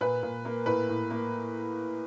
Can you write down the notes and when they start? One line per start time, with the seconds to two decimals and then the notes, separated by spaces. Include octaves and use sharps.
0.01 A#2 B4
0.23 A#2
0.45 A#3
0.66 A2 B4
0.89 A2
1.11 A#3